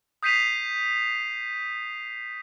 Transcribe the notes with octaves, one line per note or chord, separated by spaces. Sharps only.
D#6 G6 B6 C7 D#7 F7